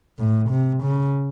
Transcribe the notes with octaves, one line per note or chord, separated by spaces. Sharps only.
A2
C3
C#3